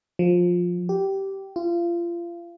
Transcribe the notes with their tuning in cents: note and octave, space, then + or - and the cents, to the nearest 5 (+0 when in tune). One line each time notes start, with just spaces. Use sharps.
F3 +15
G4 -15
F4 -30